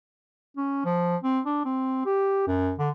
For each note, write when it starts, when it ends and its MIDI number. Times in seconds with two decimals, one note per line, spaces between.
0.57 0.81 61
0.85 1.16 53
1.23 1.40 60
1.45 1.62 62
1.65 2.04 60
2.05 2.44 67
2.47 2.73 42
2.78 2.89 50